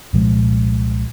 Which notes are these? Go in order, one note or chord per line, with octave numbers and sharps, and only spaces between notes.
C2 A#2 F3 G#3